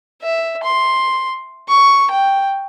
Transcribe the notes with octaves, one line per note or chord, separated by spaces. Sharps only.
E5
C6
C#6
G5